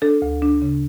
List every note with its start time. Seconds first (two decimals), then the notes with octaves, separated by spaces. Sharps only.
0.02 D4 A4
0.22 D2
0.42 D4
0.62 C#3